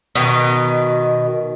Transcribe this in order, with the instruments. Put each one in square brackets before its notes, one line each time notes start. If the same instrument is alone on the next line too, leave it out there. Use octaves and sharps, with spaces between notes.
[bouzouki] B2 D#3